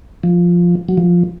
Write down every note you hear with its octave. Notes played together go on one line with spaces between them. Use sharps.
F3
F#3
F3